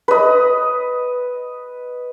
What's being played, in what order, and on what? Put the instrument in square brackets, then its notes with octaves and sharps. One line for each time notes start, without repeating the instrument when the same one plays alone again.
[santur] B4 D#5